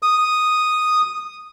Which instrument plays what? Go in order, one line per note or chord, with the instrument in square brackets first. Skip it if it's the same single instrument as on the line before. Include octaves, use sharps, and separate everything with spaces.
[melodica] D#6